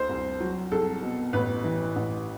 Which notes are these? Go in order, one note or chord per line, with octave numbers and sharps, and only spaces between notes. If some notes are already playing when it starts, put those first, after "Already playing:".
Already playing: D2 C5
C2
F#3
C2 A4
B2
A1 B4
E3
A1